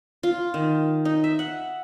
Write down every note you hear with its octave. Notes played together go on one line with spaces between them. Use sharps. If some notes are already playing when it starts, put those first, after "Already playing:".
F4
D#3
D#4
E5
F#5